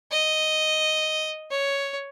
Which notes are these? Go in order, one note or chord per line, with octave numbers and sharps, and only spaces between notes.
D#5
C#5